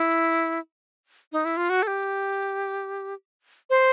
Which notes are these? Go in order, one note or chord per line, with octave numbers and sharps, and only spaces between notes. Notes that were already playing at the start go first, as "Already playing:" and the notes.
Already playing: E4
D#4
E4
F4
F#4
A4
G4
C5